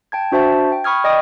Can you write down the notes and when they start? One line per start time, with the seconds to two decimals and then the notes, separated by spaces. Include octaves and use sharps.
0.12 G5 A5 G#6
0.32 D4 F#4 C5 E5 A5
0.72 G5
0.84 B5 C#6 D#6 F6 G#6
1.04 D5 D#5 G5 D#6